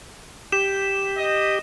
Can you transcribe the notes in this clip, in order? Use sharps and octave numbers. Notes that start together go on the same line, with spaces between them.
G4 E7
D#5